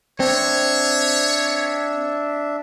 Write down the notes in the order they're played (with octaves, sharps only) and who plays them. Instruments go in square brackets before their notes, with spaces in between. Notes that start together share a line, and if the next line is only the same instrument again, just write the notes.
[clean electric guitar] C4 [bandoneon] D4 E5 [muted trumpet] C#5